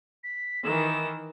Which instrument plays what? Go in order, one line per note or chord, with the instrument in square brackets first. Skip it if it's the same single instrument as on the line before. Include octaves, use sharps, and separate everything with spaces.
[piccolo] B6
[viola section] D#3 E3 [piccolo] E7